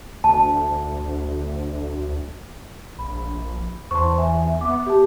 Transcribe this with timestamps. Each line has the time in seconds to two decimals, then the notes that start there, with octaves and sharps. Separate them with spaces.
0.24 D2 A5
2.99 A#1 B5
3.91 E2 C5 A5 C6 C#6
4.18 E5 G#5
4.61 B3 D6
4.86 G4 A5